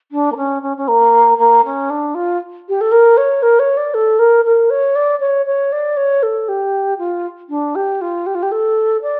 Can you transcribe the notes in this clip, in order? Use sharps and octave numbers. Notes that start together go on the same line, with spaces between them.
D4
A#3
C#4
C#4
C#4
A#3
A#3
C#4
D4
F4
G4
A4
A#4
C#5
A#4
C#5
D5
A4
A#4
A#4
C#5
D5
C#5
C#5
D5
C#5
A4
G4
F4
D4
G4
F4
G4
F4
G4
A4
D5